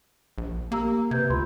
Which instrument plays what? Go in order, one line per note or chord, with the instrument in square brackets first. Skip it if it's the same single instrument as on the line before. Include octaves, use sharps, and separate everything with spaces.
[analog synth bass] A#1
[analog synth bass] A#3 [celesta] G4 A#5 E6
[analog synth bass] C3 [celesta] B4 G6 G#6
[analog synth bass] D2 [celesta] F4 B5 C6